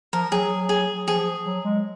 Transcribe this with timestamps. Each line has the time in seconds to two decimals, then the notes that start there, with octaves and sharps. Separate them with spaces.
0.13 F3 A#4
0.31 F#3 G#4
0.69 G#4
1.08 F3 G#4
1.46 F#3
1.64 G#3